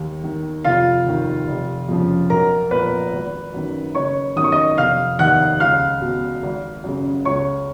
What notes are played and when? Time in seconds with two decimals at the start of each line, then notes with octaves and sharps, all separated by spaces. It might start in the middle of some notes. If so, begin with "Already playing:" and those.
Already playing: D#2
0.24 D#3
0.64 F1 F4 F5
1.06 D#2 D#3
1.47 F1
1.89 F2 C#3 F3
2.30 B1 A#4 A#5
2.71 A#2 F3 B4 B5
3.12 G#1
3.54 F#2 D#3
3.95 F#1 C#5 C#6
4.36 F#2 D#3 D#6
4.44 C#6
4.52 D#5 D#6
4.78 F1 F5 F6
5.19 D#2 D#3 F#5 F#6
5.60 C#2 F5 F6
6.02 B2
6.43 G#1
6.84 F#2 C#3
7.25 C#2 C#5 C#6